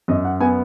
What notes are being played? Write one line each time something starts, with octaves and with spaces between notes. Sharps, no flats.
F#2 D#5
F#5
B3 G#5